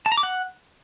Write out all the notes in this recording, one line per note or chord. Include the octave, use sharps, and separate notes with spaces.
A5
A#5
D6
F#5